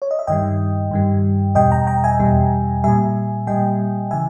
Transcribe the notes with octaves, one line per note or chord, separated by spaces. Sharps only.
C#5
D#5
E5
G2 D#3 G3 D#5 G5
G2 D#3 G3
E2 B2 G3 D#5 G5
G5 A#5
G5 A#5
E5 G#5
E2 B2 G3
A#2 G3 E5 G#5
A#2 G3 D#5 G5
C#3 E3 E5 G#5